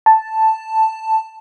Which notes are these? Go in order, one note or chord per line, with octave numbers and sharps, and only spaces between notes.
A5